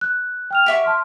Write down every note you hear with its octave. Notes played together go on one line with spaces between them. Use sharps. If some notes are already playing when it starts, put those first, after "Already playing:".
F#6
G5 F6 F7
G4 E5 F#5 C#6
A5 C6 F6